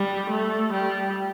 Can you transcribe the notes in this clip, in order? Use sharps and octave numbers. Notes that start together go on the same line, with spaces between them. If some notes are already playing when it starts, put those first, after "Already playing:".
Already playing: G3
A3
G3